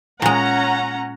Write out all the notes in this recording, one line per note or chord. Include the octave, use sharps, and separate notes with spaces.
A#2 G#3 C#4 F#5 A#5